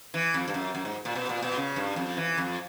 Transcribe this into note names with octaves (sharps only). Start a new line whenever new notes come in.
E3
F2
G2
F#2
F#2
G#2
A#2
B2
A#2
B2
C#3
G2
F2
E3
F2